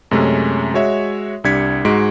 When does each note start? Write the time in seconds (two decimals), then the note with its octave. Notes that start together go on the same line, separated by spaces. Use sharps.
0.11 F#2 C3 G#3 A3 C#4
0.74 G#3 F#4 C#5 E5
1.44 C2 G3 D4 G#6 B6 C#7
1.85 G#2 G#3 F#4 D7